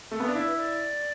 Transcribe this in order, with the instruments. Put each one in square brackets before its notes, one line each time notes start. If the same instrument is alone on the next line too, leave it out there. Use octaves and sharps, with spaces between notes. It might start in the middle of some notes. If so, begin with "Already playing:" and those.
[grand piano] A3
B3
D4
[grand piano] E4 [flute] D5
[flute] B4
D5